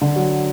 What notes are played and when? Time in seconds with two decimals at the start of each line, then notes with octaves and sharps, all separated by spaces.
0.01 D3
0.16 F#3